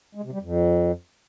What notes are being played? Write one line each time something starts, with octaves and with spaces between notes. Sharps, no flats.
G#3
C3
G3
F2